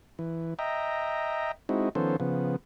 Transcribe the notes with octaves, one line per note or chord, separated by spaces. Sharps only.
E3
D#5 E5 G5 A#5
G#3 C4 D#4 E4 F#4
D#3 F3 B3 C#4 A4 C5
C#3 F3 B3